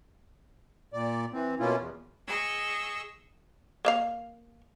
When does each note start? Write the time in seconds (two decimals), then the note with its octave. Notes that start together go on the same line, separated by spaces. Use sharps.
0.93 A#2 D5
1.33 E3 C4
1.60 B2 A#3 C#4 E4 F4
1.77 E2
2.26 G#4 D#5 C#6 E6
3.85 A#3 E5 F5